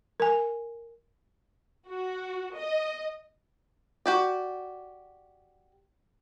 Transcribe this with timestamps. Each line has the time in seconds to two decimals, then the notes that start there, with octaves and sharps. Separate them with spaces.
0.20 A#4 G#5
1.88 F#4
2.56 D#5
4.06 F#4 G4 D5